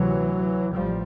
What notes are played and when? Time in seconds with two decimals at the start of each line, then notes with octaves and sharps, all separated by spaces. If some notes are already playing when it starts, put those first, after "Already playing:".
Already playing: D2 C3 E3 F#3
0.73 A1 F3 G3